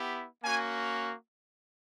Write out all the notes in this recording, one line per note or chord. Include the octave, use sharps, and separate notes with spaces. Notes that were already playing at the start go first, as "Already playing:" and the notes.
Already playing: B3 E4 G4
A#3 C#4 F#4 G#5